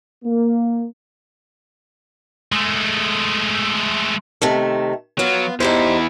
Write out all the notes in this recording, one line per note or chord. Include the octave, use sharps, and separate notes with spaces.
A#3
G#3 A3
C3 D#3 A3
F#3 B3 F4
E2 D#4 E4 G4 C5